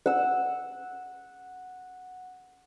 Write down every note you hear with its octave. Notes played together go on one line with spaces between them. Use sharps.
F#5 E6